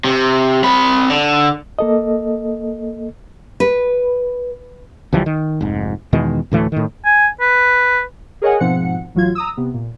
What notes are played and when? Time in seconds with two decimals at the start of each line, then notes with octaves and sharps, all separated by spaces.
0.04 C3
0.64 C4 B5
1.10 D3
1.79 A#3 A4 D#5
3.60 B4
5.13 C#2 E3 F3 G3
5.26 D#3
5.61 F1 G#2
6.13 E2 B2 D#3 G#3
6.51 D2 A2 E3 A3
6.72 A2 D#3
7.05 G#5
7.41 B4
8.42 G#4 A#4 C#5 D#5 F#5 G#5
8.60 G#2 B2 F3 C4 F#5 C#7
9.15 A1 F#3 F4 G#6
9.35 A#5 D#6 E6
9.57 C3 B3
9.74 A#2